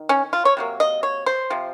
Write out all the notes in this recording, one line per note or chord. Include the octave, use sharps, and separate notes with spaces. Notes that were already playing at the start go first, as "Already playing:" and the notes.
Already playing: D#3
C#4
F4
C#5
C3 F#3 A#3
D#5
C#5
C5
C3 F3